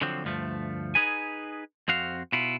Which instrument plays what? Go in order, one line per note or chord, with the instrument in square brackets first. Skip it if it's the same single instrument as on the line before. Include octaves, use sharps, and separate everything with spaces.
[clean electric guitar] D3 F3 F#3 C4
D2 G2 F3 A3
D#4 G#4 B4 G#5
F2 C4 F#4 F5
B2 E4 F4